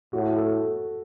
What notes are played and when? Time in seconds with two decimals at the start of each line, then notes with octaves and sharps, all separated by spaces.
0.13 A2 F#4
0.36 A4